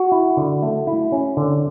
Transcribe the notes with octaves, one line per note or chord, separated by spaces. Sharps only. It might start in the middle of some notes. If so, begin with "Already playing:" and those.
Already playing: F#4
E4
D3
A3
E4
C#4
D3